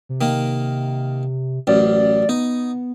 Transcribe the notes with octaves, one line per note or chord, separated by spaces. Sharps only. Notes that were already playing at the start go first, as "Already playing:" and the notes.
C3
D#3 A#3
A1 F#2 D5
B3 D#4